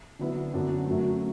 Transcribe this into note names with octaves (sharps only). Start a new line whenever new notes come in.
D3 F#3 B3 E4 B4
F#2 D3 B3 D4 F#4
F#2 F#3 A3